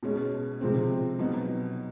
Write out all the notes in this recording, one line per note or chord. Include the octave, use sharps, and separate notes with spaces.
B2 G#3 C#4
C3 F3 G#3 C4
B2 F#3 B3 D#4